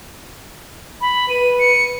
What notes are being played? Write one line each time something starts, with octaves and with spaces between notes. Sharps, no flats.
B5
B4 D#7
C#7